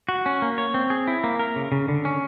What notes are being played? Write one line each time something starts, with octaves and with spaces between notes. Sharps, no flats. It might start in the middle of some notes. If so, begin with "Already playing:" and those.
F#4
C#4
A#3
C#5
C4
G#4
E4
A#3
A#4
C#3
C#3
D3
C#4